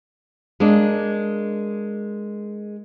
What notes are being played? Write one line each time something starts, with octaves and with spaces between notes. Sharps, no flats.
G#3 A#3 D4